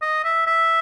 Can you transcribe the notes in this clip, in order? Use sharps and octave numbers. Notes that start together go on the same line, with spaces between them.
D#5
E5
E5